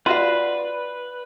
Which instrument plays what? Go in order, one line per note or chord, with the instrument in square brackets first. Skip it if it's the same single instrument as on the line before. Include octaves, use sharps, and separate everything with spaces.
[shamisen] F4 F#4 F5 [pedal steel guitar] B4 [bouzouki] D5 G#5